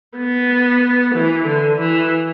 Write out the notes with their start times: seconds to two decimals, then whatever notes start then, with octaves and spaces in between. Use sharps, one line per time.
0.17 B3
1.14 E3
1.46 D3
1.78 E3